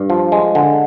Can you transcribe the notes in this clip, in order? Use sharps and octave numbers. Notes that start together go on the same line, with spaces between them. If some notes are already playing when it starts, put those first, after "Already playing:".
Already playing: G2
F3
G#3
D3